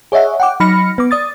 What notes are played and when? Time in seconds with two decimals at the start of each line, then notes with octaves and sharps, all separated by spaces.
0.12 G#4 C#5 D#5 E5 F#5
0.40 F#5 G5 D6
0.60 F#3 D#4 B5 F6 A#6 C#7
0.98 B3 D6
1.11 D5 D#6 A6